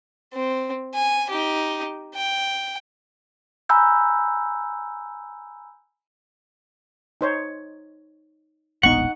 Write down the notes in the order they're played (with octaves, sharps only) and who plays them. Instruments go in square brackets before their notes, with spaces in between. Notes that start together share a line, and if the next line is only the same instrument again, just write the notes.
[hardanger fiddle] C4
G#5
D#4 G4
G5
[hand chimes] G#5 A#5 B5 E6 F#6 G6
[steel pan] D#4 C5 C#5
[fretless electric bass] E1 A#1 B3 [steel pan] D#4 C#6 [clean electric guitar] F#5